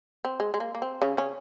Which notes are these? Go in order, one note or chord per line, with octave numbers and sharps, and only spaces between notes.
C4
G#3
G#3
A#3
A#3
C4
C#3 C#4
C#3 C#4